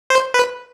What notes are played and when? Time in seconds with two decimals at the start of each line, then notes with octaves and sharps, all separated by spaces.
0.10 C5
0.34 B4